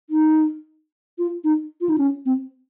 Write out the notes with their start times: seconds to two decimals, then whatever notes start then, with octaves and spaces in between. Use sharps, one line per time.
0.10 D#4
1.19 F4
1.44 D#4
1.81 F4
1.89 D#4
1.98 C#4
2.26 C4